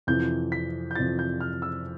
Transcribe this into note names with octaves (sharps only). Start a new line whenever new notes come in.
F2 C3 E3 G6
B6
G6
F2 C3 E3 A6
G6
F6
E6